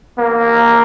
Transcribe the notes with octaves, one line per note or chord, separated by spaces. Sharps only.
A#3